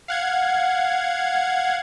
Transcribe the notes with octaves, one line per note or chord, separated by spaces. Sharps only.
F5 F#5 G#6